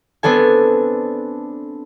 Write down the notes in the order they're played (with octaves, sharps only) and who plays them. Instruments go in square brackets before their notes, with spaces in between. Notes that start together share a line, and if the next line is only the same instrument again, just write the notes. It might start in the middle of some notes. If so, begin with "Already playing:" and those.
[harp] B3 C4 D4 A4 G#5